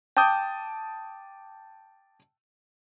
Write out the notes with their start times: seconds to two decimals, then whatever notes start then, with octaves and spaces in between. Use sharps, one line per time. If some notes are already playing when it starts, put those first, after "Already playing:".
0.17 G5 A5 D6 D#6 G6